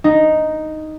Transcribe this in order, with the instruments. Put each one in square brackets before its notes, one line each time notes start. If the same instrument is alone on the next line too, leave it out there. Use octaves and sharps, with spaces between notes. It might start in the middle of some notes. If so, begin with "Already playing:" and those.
[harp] D#4